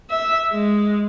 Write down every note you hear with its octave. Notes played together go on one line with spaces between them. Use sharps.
E5
G#3